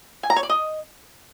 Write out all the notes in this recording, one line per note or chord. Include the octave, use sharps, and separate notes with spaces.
G#5
A#5
C#5
D5
D#5